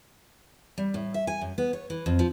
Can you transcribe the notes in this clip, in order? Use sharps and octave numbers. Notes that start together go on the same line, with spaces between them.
G3
A2
E5
G#5
F#2
B3
C#5
E3
F2
F3